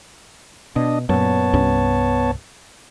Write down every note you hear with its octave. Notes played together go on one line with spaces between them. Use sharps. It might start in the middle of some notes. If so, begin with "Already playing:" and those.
B2 D4 D#5
F#2 A#2 B3 C#5 A5
C2 G2 C#4